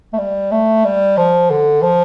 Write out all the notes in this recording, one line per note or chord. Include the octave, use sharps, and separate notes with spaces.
A3
G3
A3
G3
F3
D3
F3